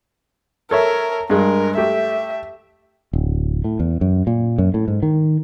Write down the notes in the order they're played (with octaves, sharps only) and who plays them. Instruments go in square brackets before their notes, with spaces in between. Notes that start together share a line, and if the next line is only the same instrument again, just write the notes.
[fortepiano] A4 C#5 E5 [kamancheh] A#4
[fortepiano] G2 G#3 [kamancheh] A#4
[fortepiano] A3 G4 [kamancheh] E5
[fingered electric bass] D1
A2
E2
F#2
A#2
F#2
A2
G#2
D#3